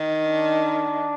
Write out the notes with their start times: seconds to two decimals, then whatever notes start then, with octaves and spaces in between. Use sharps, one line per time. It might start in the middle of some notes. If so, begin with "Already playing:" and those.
Already playing: D#3
0.25 D4